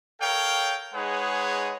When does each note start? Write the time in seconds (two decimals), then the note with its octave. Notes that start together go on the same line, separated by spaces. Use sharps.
0.20 A4 A#4 C#5 F5 G5
0.94 G#3 D#4 G#4 B4 C#5 F#5